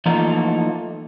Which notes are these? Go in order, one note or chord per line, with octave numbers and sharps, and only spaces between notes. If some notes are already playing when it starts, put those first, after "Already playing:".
E3 F3 A3 A#3 D#4 A#5